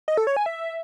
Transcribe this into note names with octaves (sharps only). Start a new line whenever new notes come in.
D#5
A4
C#5
G#5
E5